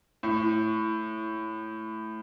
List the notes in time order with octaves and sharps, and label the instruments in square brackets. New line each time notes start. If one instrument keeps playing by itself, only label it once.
[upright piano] A2